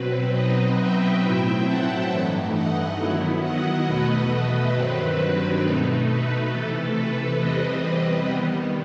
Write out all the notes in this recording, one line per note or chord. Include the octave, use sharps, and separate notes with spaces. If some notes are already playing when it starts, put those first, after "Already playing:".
Already playing: B2 F#3 C4 B4
B2 F#3 C4 D#4 B4 D#5
E5 G5
A2 F#3 C4 E4 E5 G5
F#5 A5
G2 E3 A3 D#4
D#5 F#5
D#3 F#3 B3 E4
D#5 F#5
E2 B2 A3 B4 D#5
B4 D#5
G2 D#3 F#3 C4 B4
B2 A3 D#4
B4
C3 E3 A3 A4
B4
E2 C3 E3 G3 C4 B4 D#5
D#3 G3 B3